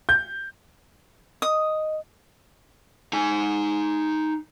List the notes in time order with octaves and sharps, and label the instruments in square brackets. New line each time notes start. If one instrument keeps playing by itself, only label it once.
[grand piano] G6
[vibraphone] D#5 [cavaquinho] D#6
[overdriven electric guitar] D#4 G#5